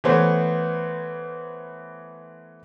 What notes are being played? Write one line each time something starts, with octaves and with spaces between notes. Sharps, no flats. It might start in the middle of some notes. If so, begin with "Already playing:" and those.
E3 A3 B3 C5 C#5